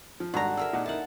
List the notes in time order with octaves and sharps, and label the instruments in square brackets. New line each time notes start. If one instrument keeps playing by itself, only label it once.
[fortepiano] F3
[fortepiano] G#1 G#2 G3 [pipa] D3 A#5 [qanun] F#4
[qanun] G#4 A#4 E5 [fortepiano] E6
[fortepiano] A#2 D#4 F#5
[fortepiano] A#3 D#4 E4 [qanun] F#5 A5